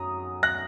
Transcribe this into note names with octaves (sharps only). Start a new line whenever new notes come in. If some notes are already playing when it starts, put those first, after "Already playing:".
Already playing: F#2 F#3 A#5 D#6
F#6 A#6